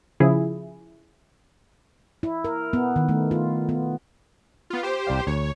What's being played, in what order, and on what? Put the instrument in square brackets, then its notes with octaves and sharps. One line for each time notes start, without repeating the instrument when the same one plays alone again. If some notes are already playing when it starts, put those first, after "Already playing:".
[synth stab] C#3 F3 E4 G#4
[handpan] E4
A#4
B3
D#3
A3
F4
B3
[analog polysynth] B3 F4
G4 C5
[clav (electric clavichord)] C2 D5 F5
[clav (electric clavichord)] D2 [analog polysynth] C#5